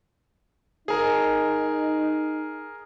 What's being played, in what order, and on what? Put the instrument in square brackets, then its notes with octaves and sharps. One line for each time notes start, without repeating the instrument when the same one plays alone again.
[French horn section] D#4 [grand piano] G#4 A#4